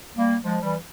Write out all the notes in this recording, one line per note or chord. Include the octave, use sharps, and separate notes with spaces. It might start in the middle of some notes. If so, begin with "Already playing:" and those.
G3 A#3
F3 G#3
E3 G3